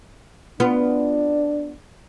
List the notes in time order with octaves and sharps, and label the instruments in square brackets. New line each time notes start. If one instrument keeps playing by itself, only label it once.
[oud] B3 F4 [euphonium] D4